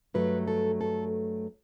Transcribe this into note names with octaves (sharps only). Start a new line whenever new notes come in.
G2 F#3 A3 B4
A4
A4